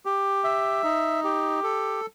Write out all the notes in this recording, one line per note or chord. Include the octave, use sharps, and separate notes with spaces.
G4
E5
D#4
G4
A4